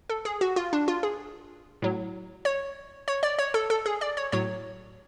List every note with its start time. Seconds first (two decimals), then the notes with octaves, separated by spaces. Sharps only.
0.10 A4
0.25 G#4
0.41 F#4
0.56 F4
0.73 D4
0.88 F4
1.03 G#4
1.82 A2 F#3
2.45 C#5
3.08 C#5
3.23 D5
3.39 C#5
3.54 A4
3.70 A4
3.86 G#4
4.01 D5
4.17 C#5
4.32 A2 F#3 C#5